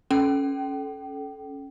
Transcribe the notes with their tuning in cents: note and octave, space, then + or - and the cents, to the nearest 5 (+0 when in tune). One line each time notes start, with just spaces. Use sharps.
C#4 +0 A4 -20 G5 -25